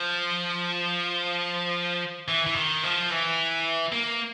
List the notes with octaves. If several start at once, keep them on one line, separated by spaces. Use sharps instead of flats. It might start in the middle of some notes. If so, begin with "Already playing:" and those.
Already playing: F3
E3
E3
D#3
F3
E3
A#3